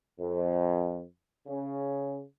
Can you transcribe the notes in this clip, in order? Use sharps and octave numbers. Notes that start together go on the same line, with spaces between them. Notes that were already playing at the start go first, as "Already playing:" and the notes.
F2
C#3